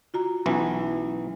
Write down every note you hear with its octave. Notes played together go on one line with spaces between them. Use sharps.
F4 F#4 A#5
B1 E3 C#4 E4